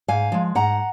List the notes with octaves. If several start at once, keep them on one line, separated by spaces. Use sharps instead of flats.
G#2 F5 G#5
F3 G#3
G#2 F#5 A#5